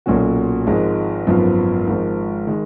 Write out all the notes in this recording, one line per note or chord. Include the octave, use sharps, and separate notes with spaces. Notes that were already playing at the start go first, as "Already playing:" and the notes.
B1 A#2 F#3 C#4 F#4
G#1 G#2 F3 G#3
G#1 F#2 F3 B3 F4
G#1 G#2 F3
D#3 G#3